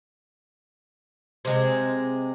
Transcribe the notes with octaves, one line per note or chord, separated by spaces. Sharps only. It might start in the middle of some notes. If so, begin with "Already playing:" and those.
C3 G#3